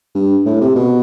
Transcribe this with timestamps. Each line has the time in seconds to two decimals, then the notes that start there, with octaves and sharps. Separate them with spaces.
0.15 G2
0.46 A2
0.61 C3
0.76 B2